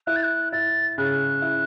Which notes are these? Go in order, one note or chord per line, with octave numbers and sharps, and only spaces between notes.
E4 F#6
A6
F#6
E4 A6
C#3 F#6
E4